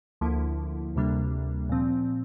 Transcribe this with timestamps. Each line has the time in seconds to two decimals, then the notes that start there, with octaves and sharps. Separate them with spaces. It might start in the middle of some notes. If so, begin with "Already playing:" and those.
0.21 D2 D3 F3 A#3 E4
0.96 D2 C3 G3 A#3 D4
1.69 A#2 F3 C4